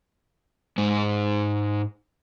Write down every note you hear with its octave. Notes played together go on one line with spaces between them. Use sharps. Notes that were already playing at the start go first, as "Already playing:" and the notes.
G#2 G#3